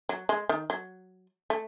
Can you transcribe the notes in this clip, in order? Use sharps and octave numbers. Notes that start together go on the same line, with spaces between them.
F#3
G#3
D#3
F#3
A3